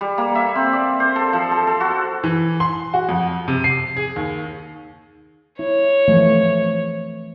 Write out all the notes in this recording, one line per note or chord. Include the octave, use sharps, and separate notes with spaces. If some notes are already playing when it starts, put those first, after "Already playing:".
G3
A#3
E5
C4
D5
C5
A4
F3
A4
A4
F#4
E3
C6
F#4
F2
C3
C7
G#4
D#2
E4 C#5
E3 F3 A3